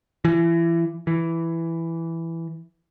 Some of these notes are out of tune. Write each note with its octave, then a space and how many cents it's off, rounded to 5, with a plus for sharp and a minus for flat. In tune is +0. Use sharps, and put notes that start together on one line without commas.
E3 +25
E3 +5